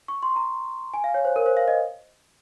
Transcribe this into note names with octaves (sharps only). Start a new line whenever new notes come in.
C#6
C6
A#5
G#5
F5
C#5
C5
A#4
C5
F5
D#5